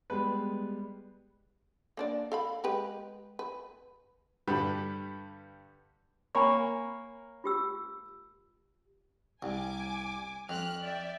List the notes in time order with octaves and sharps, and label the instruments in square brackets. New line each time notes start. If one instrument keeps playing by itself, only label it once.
[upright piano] G3 G#3 B3 [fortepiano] B4
[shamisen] A#3 D4 D5
A4 F5 B5
G#3 G4 B4
B4
[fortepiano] G2 D3 G3 B4 B5
[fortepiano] A#3 A#4 C#5 [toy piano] G#5 B5 C#6
[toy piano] F4 G4 E6
[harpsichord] C2 [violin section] G#5 D6
[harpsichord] F2 [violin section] F6 F#6
[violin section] D5 E5 G5